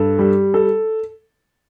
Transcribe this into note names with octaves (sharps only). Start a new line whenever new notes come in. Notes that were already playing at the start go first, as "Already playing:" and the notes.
Already playing: G2 A4
G3
A4